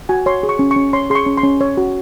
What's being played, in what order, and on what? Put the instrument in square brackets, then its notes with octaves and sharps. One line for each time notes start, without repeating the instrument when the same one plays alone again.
[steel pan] F#4 G#5
C#5 C6
G#4
C#6
C#4
C#6
C#4
C#5 C6
G#4 C6
C#6
C#4
C6
C#4
C#5
F#4